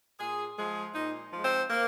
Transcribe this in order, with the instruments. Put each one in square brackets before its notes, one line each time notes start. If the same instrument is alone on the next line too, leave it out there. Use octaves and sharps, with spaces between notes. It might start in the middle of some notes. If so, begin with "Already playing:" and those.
[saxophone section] A#2 G#4
F3 G#3 G#4
A#2 D#4
F3 G#3
C4
A#3